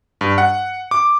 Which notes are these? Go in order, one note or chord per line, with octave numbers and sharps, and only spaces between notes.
G2
F#5
D6